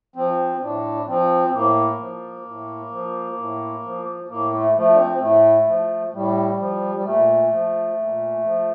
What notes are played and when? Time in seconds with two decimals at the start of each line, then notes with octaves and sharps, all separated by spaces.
0.16 F3 C4
0.61 A2 D4
1.07 F3 C4
1.53 A2 A#3
1.99 F3
2.45 A2
2.91 F3
3.37 A2
3.83 F3
4.29 A2 A#3
4.52 A3
4.75 F3 A3
4.93 D4
4.97 C4
5.20 A2 A3
5.66 F3
6.13 A2 G3
6.58 F3
6.95 G3
7.05 A#2 A3
7.51 F3
7.97 A#2
8.43 F3